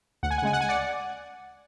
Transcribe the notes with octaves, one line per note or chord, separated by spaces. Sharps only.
D2 F#5
G#5
F#5
C#3 G#3 G#5
F#5
G#5
D5 F#5